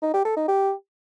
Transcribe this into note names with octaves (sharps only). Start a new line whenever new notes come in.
D#4
G4
A4
D#4
G4